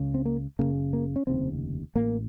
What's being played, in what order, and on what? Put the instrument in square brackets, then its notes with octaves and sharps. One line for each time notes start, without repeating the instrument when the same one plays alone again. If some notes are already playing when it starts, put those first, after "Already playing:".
Already playing: [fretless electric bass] C#2 C#3
C4
A#3
F#1 F2 C#3 A#3
A#3
C#4
F1 D#2 C#3 C4
A1 A2 A#3